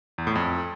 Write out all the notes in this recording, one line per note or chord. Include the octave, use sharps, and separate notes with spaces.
E2
A2
F2